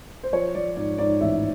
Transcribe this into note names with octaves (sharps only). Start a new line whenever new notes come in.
C5
F3 C#5
F3 D5
G#2 D5
G#2 D5
A1 E5